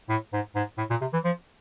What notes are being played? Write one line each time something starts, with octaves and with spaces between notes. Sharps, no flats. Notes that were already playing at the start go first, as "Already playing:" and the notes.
A2
G#2
G#2
A2
A#2
C3
E3
F3